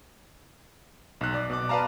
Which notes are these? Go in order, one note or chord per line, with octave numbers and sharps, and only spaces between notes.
B1 F#6
D5
B2 D6
B4 D5 F5 A5 A#5